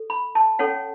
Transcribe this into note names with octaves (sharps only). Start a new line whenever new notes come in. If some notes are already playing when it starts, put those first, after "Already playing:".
Already playing: A4
B5
A5
C#4 A4 C#5 F#5